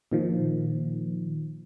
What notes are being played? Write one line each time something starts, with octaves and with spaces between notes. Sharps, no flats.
A#2 D#3 F3